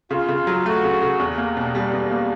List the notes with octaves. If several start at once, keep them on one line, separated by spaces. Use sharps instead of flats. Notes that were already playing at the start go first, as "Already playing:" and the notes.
C#3 F4
C#3
F#3
A3 F#4
C#3
C#3
E2 G4
A#3
B2
G3
E2
A#3